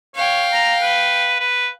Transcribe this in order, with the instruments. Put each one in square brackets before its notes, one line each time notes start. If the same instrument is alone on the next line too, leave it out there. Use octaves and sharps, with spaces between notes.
[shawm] C#5 [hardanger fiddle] F5 G5
[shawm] A#5
B4
B4